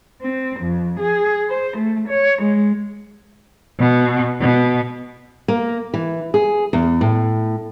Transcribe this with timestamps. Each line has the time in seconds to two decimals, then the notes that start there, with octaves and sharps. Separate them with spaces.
0.22 C4
0.60 F2
1.00 G#4
1.49 C5
1.77 A3
2.09 C#5
2.42 G#3
3.79 B2
4.40 B2
5.48 A#3
5.94 E3
6.34 G#4
6.73 E2
7.01 A2